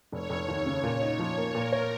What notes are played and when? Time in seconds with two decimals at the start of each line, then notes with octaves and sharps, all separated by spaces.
0.12 F1 C#5
0.30 F1
0.48 D#2
0.66 C#3
0.83 A#2
1.01 D#4
1.19 F3
1.37 A#3
1.55 A#2 A#4
1.72 C#5